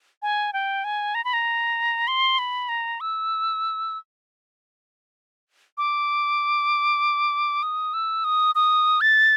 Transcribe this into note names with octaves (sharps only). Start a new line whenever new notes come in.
G#5
G5
G#5
A#5
B5
A#5
C6
B5
A#5
E6
D6
D#6
E6
D#6
D#6
A6